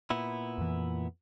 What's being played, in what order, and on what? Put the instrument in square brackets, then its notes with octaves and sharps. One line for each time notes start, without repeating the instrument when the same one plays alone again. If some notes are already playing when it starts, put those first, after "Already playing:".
[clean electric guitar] A#2 B3 E4
[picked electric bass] F2 E3